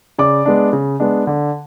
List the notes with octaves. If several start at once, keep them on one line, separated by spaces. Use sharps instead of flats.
C#3 D5 D6
G#3 B3 D4
C#3
G#3 B3 D4
D3